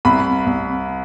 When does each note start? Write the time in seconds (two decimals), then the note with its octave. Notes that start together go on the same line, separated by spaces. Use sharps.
0.05 C2 B5
0.46 C2